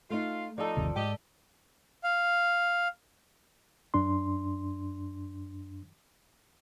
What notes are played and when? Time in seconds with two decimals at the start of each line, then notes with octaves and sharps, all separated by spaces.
0.10 A3 D#4 F4
0.58 F3 D#4 A4 D5
0.77 G1 D#2 C3
0.96 G#2 G4 D#5
2.04 F5
3.94 F#2 D4 C6